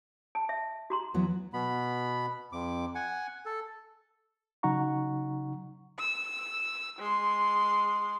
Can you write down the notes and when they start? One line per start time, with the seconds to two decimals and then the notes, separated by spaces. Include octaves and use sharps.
0.35 A5
0.49 E5
0.90 F#4 A#5 C6
1.14 E3 F#3 B3
1.54 B2 B3 B5
2.52 F2 D6
2.95 F#5 G#5
3.46 A4
4.63 C#3 F#3 D#4 F#5 A#5 C#6
5.99 E6
6.99 G#3 C6